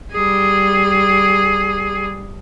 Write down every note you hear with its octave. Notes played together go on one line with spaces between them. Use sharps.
G3 G#4